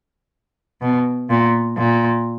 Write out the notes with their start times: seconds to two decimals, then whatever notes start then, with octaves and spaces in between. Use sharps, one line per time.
0.82 B2
1.30 A#2
1.78 A#2